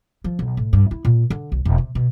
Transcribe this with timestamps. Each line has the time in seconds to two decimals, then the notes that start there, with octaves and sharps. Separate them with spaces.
0.24 F3
0.39 B1
0.57 A2
0.73 G2
0.91 E4
1.05 A#2
1.30 D3
1.52 B1
1.65 E1
1.78 C3
1.95 B2